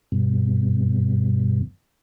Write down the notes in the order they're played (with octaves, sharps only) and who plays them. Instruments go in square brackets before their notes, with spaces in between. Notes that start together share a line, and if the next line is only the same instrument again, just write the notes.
[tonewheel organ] G2 B2